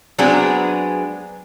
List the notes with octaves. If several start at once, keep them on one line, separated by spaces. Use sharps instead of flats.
F#3 G#3 B3 C4 D4 G#4